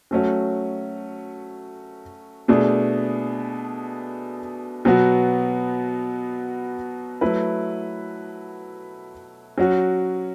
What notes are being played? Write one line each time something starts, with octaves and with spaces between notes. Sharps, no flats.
F#3 A3 C#4 F#4
B2 A3 D4 G#4
B2 F#3 B3 F#4
F#3 A3 E4 B4
F#3 C#4 F#4